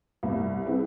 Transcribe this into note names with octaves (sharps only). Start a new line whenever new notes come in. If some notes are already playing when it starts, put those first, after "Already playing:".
C2
C4 E4 G#4 B4